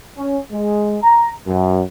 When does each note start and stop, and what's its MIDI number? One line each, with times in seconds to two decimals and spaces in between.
0.17 0.39 61
0.52 0.97 56
1.03 1.30 82
1.47 1.81 42